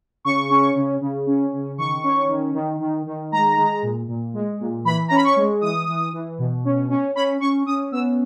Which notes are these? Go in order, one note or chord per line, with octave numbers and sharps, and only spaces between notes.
C#3 C#6
C#4
C#3
C#3
C#4
C#3
D#3 C#6
C#4
D#3
D#3
D#3
D#3
G#3 A#5
G#3
A#2
A#2
G#3
A#2
E3 B5
C#4 A#5
B5
C#6
G#3
E3 D#6
E3
E3
B2
C#4
C#4
C#4 B5
C#4 C#6
C#4 D#6
B3 E6